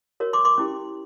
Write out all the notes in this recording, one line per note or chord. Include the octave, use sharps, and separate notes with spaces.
F#4 A#4 C#5
C6 D6
C6 D6
C#4 E4 G4